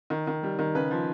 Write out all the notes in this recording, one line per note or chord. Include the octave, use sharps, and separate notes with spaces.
D#3
D#3
G3
D#3
C#3 B4
F3